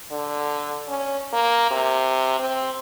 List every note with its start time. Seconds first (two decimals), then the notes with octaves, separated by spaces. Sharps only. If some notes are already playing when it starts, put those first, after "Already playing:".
0.12 D3
0.88 C#4
1.33 A#3
1.71 C3
2.40 C4